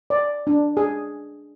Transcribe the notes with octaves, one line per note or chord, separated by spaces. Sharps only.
D5
D4
G#4